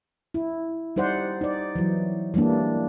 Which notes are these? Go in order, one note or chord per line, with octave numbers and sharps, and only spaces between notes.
E4
G3 D#4 C5 D5 F#5
D#4 D5
E3 F#3
E3 G3 G#3 A#3 D4